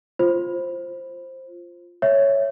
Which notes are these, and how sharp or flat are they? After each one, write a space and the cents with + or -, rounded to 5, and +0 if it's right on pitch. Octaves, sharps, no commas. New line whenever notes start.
F4 +0 C5 +10
C#5 +0 E5 +0